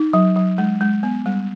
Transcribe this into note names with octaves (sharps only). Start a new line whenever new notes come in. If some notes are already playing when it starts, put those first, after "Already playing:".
Already playing: D#4
F#3
F#3
G#3
G#3
B3
G3